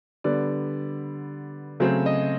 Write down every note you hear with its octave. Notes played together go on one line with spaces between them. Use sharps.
D3 G3 B3 D5
C#3 F#3 A3 C4
D#5